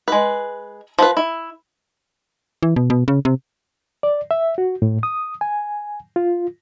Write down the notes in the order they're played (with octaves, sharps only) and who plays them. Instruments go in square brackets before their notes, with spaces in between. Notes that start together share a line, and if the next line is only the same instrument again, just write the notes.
[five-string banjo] G#3 B4
F3 B4
E4
[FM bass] E3
B2
B2
C#3
C3
[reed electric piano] D5
E5
F#4
A2
D#6
G#5
F4